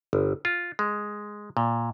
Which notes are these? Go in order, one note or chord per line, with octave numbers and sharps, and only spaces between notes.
G1
F4
G#3
A#2